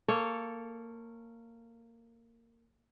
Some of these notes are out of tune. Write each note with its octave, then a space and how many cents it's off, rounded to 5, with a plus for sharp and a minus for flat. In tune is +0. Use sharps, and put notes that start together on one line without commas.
A#3 -15 A4 +0 C#5 -5